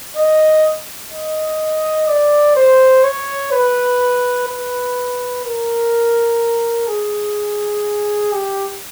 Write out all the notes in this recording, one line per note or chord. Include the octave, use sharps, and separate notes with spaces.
D#5
D#5
D5
C5
C#5
B4
B4
A#4
G#4
G4